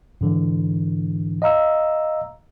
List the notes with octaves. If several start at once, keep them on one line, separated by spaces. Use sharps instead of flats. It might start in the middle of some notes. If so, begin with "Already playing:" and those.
G#2 D3 E3
D#5 F5 A#5 E6